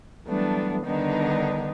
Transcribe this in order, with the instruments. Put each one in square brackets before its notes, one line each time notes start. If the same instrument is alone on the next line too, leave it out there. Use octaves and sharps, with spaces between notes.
[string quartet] E3 F#3 G3 A3 B3 D4
D3 D#3 G3 B3 D4 D#4